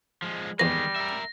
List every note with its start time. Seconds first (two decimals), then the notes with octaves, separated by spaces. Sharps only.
0.22 F3 G#3
0.59 E2 D#3 G3 G#3 B4 A#6
0.96 A#4 E5